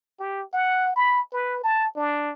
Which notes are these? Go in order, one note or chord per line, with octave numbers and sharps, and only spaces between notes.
G4
F#5
B5
B4
A5
D4